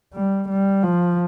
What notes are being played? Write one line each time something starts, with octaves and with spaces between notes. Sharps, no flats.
G3
G3
F3